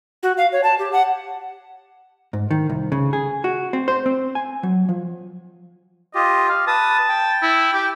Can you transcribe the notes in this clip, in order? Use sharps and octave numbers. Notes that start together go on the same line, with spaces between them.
F#4
F5
C#5
A5
G4
F#5
G#2
D#3
C2
C#3
G#4
F#4
C4
C5
C4
G#5
F#3
F3
F4 G4 D#5
F5
B4 A5 D#6
G5
E4
G4